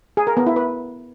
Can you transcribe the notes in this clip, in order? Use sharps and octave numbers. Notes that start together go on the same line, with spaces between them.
G#4
A#4
B3
E4
B4